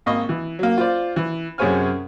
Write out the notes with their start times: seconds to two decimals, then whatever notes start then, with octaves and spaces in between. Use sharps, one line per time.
0.06 G#1 A#3 D#5 C#6
0.29 E3
0.59 F#3 A#3
0.78 F4 C5 D5
1.16 E3
1.58 F#2 C3 G#4 C#5 G#5 F6